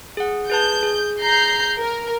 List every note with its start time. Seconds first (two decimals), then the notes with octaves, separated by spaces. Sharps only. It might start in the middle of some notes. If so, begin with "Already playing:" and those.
0.17 G#4 F#5
0.50 G#4 B4 A5 G6
0.83 G#4
1.21 A#5 G6 C7
1.77 A#4